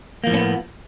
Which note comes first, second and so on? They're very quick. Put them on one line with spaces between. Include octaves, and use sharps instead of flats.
A#3 F3 A2 C#4 B3